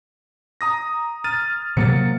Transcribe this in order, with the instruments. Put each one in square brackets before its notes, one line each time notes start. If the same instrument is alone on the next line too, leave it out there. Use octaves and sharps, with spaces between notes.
[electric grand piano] A#5 D#6 A#6
F6 A6 D#7
[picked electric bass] C3 F#3 A#3 [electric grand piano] A6 C#7